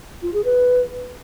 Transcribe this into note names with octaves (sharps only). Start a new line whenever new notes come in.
F4
G#4
B4